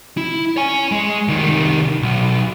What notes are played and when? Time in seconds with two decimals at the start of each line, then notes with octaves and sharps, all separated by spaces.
0.17 E4
0.57 C#5 G#5
0.92 G#3
1.28 C2 D#3
2.02 B1